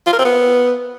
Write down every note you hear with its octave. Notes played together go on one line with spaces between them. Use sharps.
F4
A#4
C4
B3